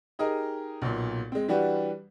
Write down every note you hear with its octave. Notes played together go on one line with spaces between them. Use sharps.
D#4 G4 G#4 A#4 D#5
B1 A#2
G#3 C4
E3 G3 D4 F#4 G4 B4